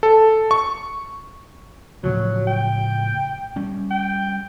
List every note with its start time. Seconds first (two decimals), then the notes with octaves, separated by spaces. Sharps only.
0.03 A4
0.51 C#6
2.04 A2 C#3 F3 F#3
2.47 G5
3.56 G3 C#4
3.91 G5